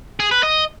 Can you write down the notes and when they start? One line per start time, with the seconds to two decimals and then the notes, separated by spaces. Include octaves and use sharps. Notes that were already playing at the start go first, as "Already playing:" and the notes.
0.20 G#4
0.31 B4
0.43 D#5